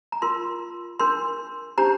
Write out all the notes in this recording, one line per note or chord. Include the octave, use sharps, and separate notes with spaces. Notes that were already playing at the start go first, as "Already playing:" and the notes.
A#5
F4 A#4 C6
D4 A#4 C6
D4 G4 C5 A#5